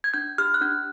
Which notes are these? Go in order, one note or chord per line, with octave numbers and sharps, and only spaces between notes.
G#6
D4 G6
G4 F6
F#6
D4 G6